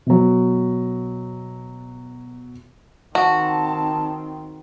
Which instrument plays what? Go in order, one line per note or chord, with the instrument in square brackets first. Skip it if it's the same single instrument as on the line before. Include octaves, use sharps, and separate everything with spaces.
[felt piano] B2 F#3
[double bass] D#3 C4 [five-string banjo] F#4 [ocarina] A5